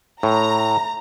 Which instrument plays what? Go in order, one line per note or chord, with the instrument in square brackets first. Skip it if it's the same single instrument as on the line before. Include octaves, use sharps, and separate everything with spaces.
[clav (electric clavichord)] A2 [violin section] A#5